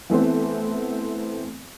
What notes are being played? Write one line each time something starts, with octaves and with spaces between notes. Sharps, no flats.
E3 A3 B3 C4